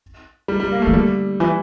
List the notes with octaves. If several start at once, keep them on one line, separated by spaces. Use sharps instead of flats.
G3
G3
A#3
A3
E3
D3 G3
E3